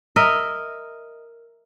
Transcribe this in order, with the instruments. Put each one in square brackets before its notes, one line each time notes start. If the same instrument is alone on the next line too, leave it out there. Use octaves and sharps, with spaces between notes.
[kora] A#4 D#5 E5